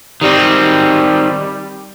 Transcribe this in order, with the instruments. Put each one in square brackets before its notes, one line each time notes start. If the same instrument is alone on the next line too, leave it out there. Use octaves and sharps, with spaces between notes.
[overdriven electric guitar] D#3 C4 [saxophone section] G3